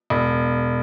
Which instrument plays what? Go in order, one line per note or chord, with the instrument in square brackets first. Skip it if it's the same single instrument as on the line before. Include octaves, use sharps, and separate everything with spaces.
[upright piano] E1